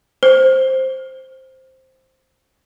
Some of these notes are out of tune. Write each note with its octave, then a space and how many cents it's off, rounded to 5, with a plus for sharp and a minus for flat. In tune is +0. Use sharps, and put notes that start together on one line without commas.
C5 +5